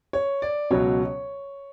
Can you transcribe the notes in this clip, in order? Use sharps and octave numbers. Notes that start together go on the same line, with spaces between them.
C#5
D5
C#2 B2 F#3 C#5